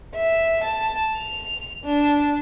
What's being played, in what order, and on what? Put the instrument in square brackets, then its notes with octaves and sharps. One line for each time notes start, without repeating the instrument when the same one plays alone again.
[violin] E5
A5
F7
D4